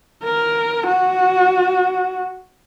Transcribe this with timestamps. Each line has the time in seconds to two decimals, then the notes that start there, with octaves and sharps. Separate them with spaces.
0.24 A#4
0.87 F#4